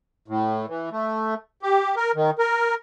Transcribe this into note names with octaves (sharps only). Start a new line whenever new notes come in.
A2
E3
A3
G4
A#4
D#3
A#4